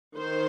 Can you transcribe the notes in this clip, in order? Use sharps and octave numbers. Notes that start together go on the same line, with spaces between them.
D#3 C5